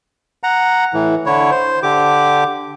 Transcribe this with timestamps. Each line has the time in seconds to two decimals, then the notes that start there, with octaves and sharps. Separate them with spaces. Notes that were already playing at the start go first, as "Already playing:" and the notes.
0.43 F#5 A#5
0.94 A2 E3
1.26 D3 E4 C#5
1.51 C5
1.83 D3 G4 D6